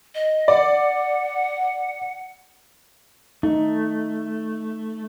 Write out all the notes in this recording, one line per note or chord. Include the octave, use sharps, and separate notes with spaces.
D#5
D5 F#5
A3 D#4